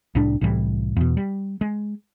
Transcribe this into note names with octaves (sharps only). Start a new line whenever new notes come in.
C2 A2 G3 D4
C2 A2 E3 G3
E2 B2
G3
G#3